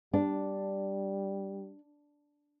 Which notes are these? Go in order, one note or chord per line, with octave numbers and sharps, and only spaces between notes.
G3 D4